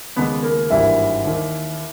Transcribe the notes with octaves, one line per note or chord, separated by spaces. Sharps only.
D#2 C#3 G#3 B3
A#3
G#1 G2 E3 G3 A#3 E4
D#2 D#3 A#3